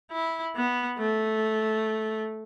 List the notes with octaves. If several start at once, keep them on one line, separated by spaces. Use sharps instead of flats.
E4
B3
A3